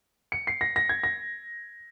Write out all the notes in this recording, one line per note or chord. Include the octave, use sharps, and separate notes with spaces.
C#7
C7
A#6
A#6
G#6
A#6